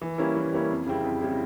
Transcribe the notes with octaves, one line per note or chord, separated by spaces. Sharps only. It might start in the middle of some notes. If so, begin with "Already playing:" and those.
E3
G3 A#3 C#4 E4
E3
G3 A#3 C#4 E4
F2
C#3 G3 C4 E4
F2
C#3 G3 C4 E4